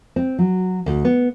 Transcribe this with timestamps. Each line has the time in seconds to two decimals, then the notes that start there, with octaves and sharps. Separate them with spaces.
0.16 C4
0.38 F#3
0.86 D2
1.05 B3